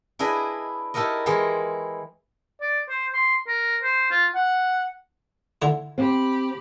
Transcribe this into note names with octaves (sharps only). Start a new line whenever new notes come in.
D4 E4 G#4 B4 D#5
D#4 E4 G4 A4 A#4 D#5
E3 G#3 G4 G#4 A#4 C5
D5
C5
C6
A#4
C5
F4
F#5
D3 E4
C4 G4 B5